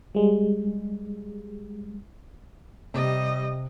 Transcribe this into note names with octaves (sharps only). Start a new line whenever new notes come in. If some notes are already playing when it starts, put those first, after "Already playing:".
G3 G#3
C3 G3 D#5